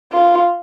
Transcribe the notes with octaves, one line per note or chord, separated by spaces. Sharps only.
F4